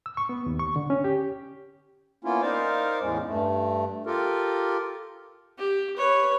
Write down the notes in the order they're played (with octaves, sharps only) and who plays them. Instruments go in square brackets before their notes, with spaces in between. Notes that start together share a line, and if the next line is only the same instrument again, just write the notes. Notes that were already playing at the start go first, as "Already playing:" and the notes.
[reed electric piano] E6
C#6
B3
D#2
C#6
D3
C#4
G4
[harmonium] A#3 B3 C#4 E4 F4
D#4 A#4 C5 D5 F5
E2 A2 G#3 C#4
G2 A3
F4 G4 A4 A#4
[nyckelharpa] G4
B4 C#5